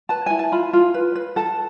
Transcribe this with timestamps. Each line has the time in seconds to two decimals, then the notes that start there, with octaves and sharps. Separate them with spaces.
0.09 B4 A5
0.26 E4 G#5
0.39 A5
0.52 F4 B5
0.73 F4
0.94 B4
1.15 B4
1.36 A4 A5